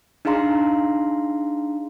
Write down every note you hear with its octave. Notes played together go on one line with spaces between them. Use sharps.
D4 D#4 G#4 F5 A#5 C6